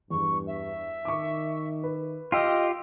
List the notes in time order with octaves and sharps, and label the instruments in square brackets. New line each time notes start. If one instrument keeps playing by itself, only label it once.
[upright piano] E2 [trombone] G2 [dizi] C#6
[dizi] E5
[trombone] D#3 [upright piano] C#6 D6
[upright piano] B4
[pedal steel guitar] F4 G4 [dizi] D#5 [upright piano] G5 E6